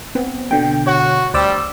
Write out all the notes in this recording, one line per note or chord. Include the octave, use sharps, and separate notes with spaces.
B3 C4
B2 D3 G5
F#4 C#5
D2 G3 C5 D5 E6